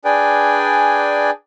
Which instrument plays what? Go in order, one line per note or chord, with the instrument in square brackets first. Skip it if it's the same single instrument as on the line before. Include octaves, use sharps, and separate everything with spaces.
[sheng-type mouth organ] D4 G#4 B4 D5 G5 G#5